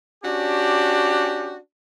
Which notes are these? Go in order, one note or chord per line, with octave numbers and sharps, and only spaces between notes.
C#4 D4 F#4 G4